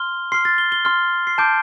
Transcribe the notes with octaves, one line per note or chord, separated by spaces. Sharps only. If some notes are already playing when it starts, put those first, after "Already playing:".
Already playing: C6 F6 G7
C6 F6 C7
A6
G7
G7
C6 F6
C7
A5 D6 G6 D7